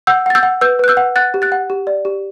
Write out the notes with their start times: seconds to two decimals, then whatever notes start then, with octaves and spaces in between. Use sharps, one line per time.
0.07 F#5 E6 G6
0.26 F#5 A6
0.35 E6 G6
0.43 F#5
0.61 B4 E6 G6
0.79 B4 F#6
0.88 E6 G6
0.97 F#5
1.16 F#5 F#6 A6
1.34 G4
1.42 F#6 A6
1.52 F#5
1.70 G4
1.87 D5
2.05 G4